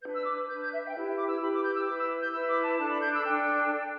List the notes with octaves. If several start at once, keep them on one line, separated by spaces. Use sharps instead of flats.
D4 B4 G6
E6
D6
D4 B4 G6
G6
E5
E5
G5
E4 G4 B4 E5
D6
E6
E4 G4 B4 B5
D6
G6
E6
E4 B4 D6
E6
G6
E4 B4 E6
D6
A5
D4 A4 A5
B5
G6
E6
D4 A4 G5